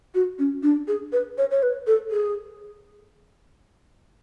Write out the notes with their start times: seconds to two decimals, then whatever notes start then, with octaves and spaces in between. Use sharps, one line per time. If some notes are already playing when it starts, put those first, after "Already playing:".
0.15 F#4
0.39 C#4
0.63 D4
0.88 G#4
1.12 B4
1.38 C#5
1.51 C#5
1.63 B4
1.87 A4
2.11 G#4